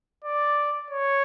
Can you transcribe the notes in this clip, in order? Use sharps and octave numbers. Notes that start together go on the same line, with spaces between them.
D5
C#5